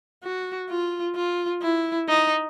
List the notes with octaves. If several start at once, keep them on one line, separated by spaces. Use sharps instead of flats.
F#4
F4
F4
E4
D#4